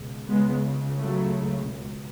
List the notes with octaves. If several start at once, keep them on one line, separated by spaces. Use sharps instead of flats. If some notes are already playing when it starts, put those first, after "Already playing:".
Already playing: C#2 B2
C#2 C#3 G#3 B3
F#3 A3
C#2 B2